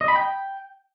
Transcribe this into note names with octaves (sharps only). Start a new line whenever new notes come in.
D#5
B5
G5